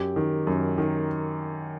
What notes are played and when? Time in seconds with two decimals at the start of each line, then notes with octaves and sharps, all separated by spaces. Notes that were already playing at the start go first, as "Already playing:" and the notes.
Already playing: F#2 G4
0.16 D#3
0.47 F#2
0.78 D#3